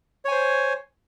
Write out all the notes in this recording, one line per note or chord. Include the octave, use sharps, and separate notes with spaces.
C5 C#5 G#5